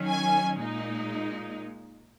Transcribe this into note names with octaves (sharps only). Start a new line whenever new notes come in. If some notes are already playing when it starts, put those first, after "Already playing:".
Already playing: D#3 F#3 C#4
G#5
A#2 G#3 D#4